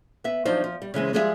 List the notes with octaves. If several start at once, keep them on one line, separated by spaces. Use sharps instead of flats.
B3 E5
F3 F#3 D4 D#4 C5
F3
G3
C#3 E3 G#3 C4
F3 G3 G#3 G#4 B4 E5